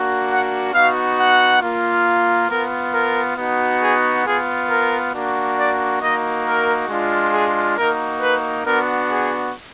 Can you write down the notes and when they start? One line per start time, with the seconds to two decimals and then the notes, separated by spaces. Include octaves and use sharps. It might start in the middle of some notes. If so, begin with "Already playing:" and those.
Already playing: A#3 D4 F#4
0.29 F#5
0.73 B3 D#4 F#4 F5
1.17 F#5
1.61 A#3 F4
2.49 B3 F4 A#4
2.94 A#4
3.37 B3 D#4 F#4
3.81 G#4
4.25 B3 F4 G#4
4.69 A#4
5.13 A#3 D4 F#4
5.57 D5
6.01 A#3 D#4 F#4 D#5
6.45 A#4
6.89 G#3 D4 F4
7.33 G#4
7.77 A#3 D#4 F#4 A#4
8.21 B4
8.65 B3 D4 F#4 A#4
9.09 G#4